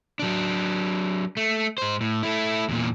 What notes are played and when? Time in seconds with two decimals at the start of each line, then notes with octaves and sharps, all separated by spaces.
0.19 F#3 D4
1.37 A3
1.78 G#2 C5
2.01 A2
2.23 A3 E4
2.69 E2 A#2